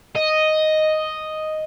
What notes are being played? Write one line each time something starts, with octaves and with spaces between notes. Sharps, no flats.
D#5